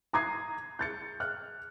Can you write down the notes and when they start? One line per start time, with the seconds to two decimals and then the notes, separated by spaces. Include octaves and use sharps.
0.13 A#5 D#6 G#6 C7
0.79 G6 A6 C#7
1.20 F6 F#6